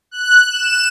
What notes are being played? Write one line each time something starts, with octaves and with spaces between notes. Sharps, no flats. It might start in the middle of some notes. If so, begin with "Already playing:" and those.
F#6
E7